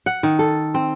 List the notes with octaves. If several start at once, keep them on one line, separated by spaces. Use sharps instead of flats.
F#5
D#3
A4
C4